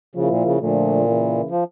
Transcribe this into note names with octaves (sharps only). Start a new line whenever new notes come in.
C#3 F3 A#3 E4
A#2
C#3
A#2 D3 F3 A3
C#3 E3 A#3 E4
F3